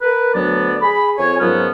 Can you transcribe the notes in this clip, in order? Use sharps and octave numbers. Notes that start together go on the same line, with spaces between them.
A#4 B4
D2 D3 F#3 B3 D5
G#4 B5
F2 C#5 G#5
G#2 F3 F#3 B3 C#4 A#4